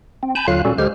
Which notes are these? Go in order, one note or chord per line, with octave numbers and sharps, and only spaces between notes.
C4
G#5 A5 B5 G6
D#2 D3 F#3 F4 F5 F#6
A#2 G3 C#4 F#4 A4
D2 D3 G#3 G4 C5 F6